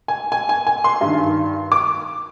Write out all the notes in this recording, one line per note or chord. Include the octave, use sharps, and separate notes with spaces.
G#5
G#5
G#5
G#5
C6
G2 D#3
D6